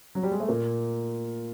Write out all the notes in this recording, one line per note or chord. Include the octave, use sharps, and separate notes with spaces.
F#3
G3
G#3
A3
A#2 A#3